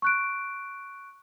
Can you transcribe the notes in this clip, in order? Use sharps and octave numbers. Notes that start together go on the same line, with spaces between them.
C#6 F#6 D7